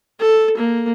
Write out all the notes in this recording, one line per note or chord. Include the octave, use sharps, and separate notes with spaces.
A4
A#3